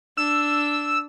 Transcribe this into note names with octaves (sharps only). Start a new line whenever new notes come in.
D4 E6